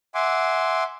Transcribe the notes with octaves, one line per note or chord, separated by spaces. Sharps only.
E5 F#5 G#5 C6 D6